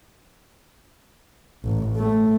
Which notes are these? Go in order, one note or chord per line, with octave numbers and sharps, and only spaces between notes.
A1
A3